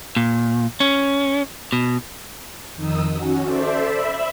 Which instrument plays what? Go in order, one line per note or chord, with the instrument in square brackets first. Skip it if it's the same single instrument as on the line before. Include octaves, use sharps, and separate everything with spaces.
[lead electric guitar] A#2
C#4
B2
[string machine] F2 D#3 D#4 D#6 E6
C#4 F#4
A4 C5 D5 E5
E5 B5